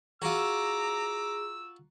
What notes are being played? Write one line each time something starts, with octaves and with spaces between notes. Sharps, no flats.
F4 F#4 G#4 A#5 D6 E6